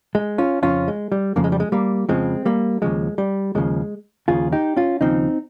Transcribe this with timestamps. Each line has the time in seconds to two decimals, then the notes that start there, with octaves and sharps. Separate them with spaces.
0.15 G#3
0.38 C#4 F4
0.62 F2 C#3 F3 C#4 F4
0.88 G#3
1.12 G3
1.36 F2 C#3 F3 A#3
1.44 G#3
1.52 G3
1.60 G#3
1.72 G3 A#3
2.09 F2 C#3 F3 G#3 C4
2.45 G3 A#3
2.82 D#2 C#3 F3 G#3
3.18 G3
3.55 D#2 C#3 F3 G#3
4.28 D#2 C#3 F3 F4 G#4
4.52 D#4 G4
4.77 C#4 F4
5.01 D#2 C#3 F3 C4 D#4